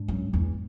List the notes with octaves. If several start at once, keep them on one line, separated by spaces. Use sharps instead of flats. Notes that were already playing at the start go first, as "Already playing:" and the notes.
Already playing: G#2 G#3 D4
F#2
E2